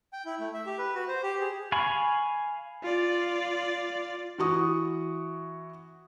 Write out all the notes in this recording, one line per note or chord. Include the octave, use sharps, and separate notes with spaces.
G5
E4
A3
E5
G4
B4
F#4
C5
G4
G#4
F5 G#5 B5 C#6
F4 D5
E3 F#4 C#6 D#6